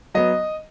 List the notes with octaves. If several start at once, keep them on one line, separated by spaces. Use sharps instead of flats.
F#3 B3 D#5